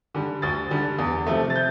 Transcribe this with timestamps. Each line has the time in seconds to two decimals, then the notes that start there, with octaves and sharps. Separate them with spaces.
0.14 D3 G3
0.42 D2 A6
0.71 D3 G3
0.99 E2
1.27 C3 F3 A3
1.50 A6
1.56 G6